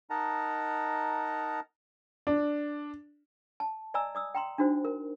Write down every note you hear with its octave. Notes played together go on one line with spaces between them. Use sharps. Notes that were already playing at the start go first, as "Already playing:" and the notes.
D#4 A#4 D#5 F#5 A5 A#5
D4
A5
D5 D#5 G#5 A#5 E6
D5 D#6 E6
G5 A#5 C6
D4 D#4 F#4 C5
A#4